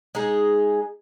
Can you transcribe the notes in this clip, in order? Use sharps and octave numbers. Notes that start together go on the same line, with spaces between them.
G#3 D#4 G#4